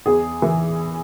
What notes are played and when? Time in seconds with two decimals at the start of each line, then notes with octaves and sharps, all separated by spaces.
0.06 E2 G#4
0.42 E3